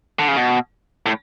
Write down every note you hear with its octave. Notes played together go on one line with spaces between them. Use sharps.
D3
C#3
B2
A2